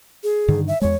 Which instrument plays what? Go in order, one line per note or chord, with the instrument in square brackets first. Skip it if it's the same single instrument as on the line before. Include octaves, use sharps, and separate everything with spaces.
[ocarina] G#4
[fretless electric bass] G2 D3 D#3
[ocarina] E5
[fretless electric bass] E2 G#3 [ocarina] C#5